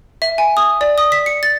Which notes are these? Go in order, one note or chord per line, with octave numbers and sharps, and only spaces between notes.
E5
G#5
D#6
D5
D#6
B6
C#7
A6